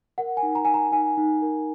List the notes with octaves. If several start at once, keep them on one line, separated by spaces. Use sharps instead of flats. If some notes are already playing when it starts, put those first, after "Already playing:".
A#4 F#5
G#5
D#4
A#5
D#4 G#5
A#5
D#4 G#5
D#4
A#4